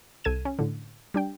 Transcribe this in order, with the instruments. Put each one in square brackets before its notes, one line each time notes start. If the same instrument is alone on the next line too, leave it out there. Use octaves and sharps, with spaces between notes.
[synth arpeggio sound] C2 A4 G#6 D#7 E7
C#4
A2 D3
G3 D4 G5